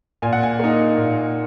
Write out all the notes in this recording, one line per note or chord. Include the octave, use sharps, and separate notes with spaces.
A#2 G#5
F#5
G#5
A#3 D#4
A#2